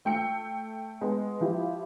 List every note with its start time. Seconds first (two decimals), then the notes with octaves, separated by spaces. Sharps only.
0.05 A3 G5 E6 C#7
1.01 G#3 B3
1.40 F3 E4 G4